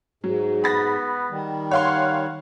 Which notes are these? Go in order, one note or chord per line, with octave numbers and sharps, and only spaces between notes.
G#2 F#3
B3 B5 A6 A#6
D#3 G3
C#5 F5 F#5 C6